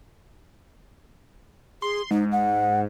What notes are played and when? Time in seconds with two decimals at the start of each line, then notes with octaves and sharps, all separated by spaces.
1.82 G#4 C6
2.11 G#2 D#4
2.32 F#5